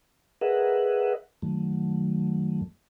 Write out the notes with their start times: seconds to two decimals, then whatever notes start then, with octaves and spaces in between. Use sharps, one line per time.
0.41 G#4 A#4 B4 D#5 E5 F#5
1.42 F#2 D#3 F#3 A3